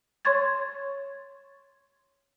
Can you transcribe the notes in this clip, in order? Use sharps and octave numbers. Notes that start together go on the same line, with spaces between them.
C#5 C6 C#6 G#6 A6